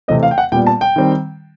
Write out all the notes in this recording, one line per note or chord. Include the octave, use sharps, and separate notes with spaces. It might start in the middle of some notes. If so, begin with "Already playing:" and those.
C3 E3 A3 C4 D#5
F5
G5
F#5
A#2 G3 B3 G5
A5
G5
D#3 G3 C4